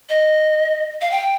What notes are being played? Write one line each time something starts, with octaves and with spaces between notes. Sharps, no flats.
D#5
F5
G5